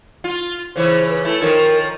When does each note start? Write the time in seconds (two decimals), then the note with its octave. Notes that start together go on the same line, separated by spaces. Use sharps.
0.24 F4
0.76 C#3 E3 C5 C#5
1.09 B4
1.25 A3 E4
1.41 D#3 F3 A#4 C#5